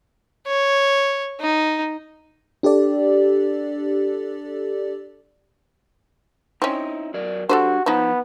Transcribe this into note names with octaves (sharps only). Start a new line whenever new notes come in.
C#5
D#4
D4 G4 A4 D5
C4 C#4 D#4 E4
F#3 A#4 D5
D4 F#4 G4 A4 B4 C5
F2 F3 B3 D#4 A5